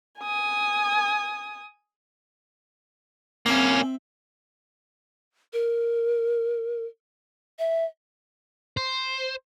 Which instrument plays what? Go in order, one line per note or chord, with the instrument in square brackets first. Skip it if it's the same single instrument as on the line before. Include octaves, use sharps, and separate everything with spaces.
[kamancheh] G#5 D#6
[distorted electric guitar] A#3 C#4 [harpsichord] C4 E5
[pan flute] A#4
E5
[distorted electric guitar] C5